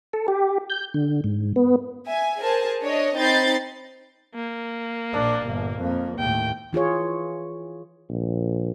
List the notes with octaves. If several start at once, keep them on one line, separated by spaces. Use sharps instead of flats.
A4
G4
G6
D3
G#2
B3
E5 G#5
G#4 A#4 C5 G#5 A5
D4 C#5 D#5
C4 D#4 B5 G6 A6 C7
A#3
A#1 D4
G1 A#2
F2 A#3
D#2 A2 G5
E3 F4 G#4 C#5
A#1